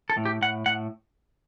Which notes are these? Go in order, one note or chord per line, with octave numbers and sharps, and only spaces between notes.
A4
A2
G4
A2 F#5
A2 F#5